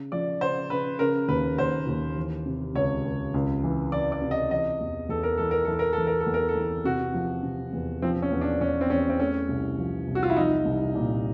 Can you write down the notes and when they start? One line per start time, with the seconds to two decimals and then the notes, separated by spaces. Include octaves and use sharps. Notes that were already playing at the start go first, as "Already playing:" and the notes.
Already playing: C#3
0.12 F3 D5
0.41 C#3 C5
0.70 C#3 B4
0.99 C#3 A#4
1.28 D#2 B4
1.58 D#2 C5
1.87 D#2
2.16 E3
2.45 C3
2.75 C#2 C#5
3.05 C#2
3.34 C#2
3.63 E3
3.92 E3 D5
4.12 D5
4.22 C3
4.31 D#5
4.51 E3 D#5
4.81 E2
5.09 E2 A4
5.23 A#4
5.38 E3 A4
5.51 A#4
5.65 E3 A4
5.79 A#4
5.93 A4
5.98 E3
6.07 A#4
6.21 A4
6.27 E2
6.34 A#4
6.48 A4
6.55 E3
6.85 C3 F#4
7.14 F3
7.43 C3
7.73 E2
8.02 F3 C4
8.22 C#4
8.32 E2
8.41 D4
8.61 E2 C#4
8.81 C4
8.90 E2 C#4
9.09 C4
9.20 A3 C#4
9.48 C2
9.78 F3
10.07 C2
10.15 F#4
10.23 F4
10.30 E4
10.37 F3 D#4
10.65 C2
10.95 A#2